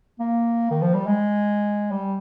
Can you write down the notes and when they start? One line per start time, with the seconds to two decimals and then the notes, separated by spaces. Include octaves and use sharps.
0.20 A#3
0.71 D#3
0.82 F3
0.95 G3
1.06 G#3
1.92 G3